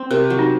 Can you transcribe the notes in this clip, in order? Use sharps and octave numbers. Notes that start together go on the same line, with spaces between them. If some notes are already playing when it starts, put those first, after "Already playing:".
Already playing: C4
C3 A#4
F#3
D#4